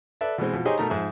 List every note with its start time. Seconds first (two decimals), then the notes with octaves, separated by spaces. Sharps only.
0.21 A4 B4 D5 E5
0.38 B2 E3 G#3 C4
0.53 B2 F3
0.65 D#4 G4 G#4 C5 C#5 D#5
0.78 B2 A3 D#4 A#4 A5 A#5
0.90 F2 G#2 G#4 E5